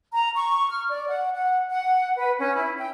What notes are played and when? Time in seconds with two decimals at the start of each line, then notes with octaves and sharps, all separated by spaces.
0.12 A#5
0.35 C#6
0.70 F6
0.90 D5
1.08 F#5
1.33 F#5
1.69 F#5
2.16 B4
2.39 C#4
2.55 E4
2.77 G5